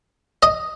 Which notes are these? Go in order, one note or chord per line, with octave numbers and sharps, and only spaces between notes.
D#5